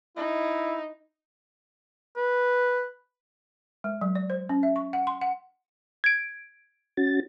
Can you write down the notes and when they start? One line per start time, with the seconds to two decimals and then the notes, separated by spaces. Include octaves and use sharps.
0.17 D#4 E4
2.16 B4
3.84 G#3
4.01 F#3
4.15 D5
4.30 C5
4.49 C#4
4.63 E5
4.76 C#6
4.93 F#5
5.07 C6
5.22 F#5
6.04 G#6 D7
6.97 C#4 F#4 A6